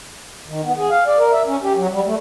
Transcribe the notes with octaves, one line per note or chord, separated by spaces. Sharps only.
D#3
B3
G#4
F5
D5
A#4
E5
C#4
G4
F#3
G3
A3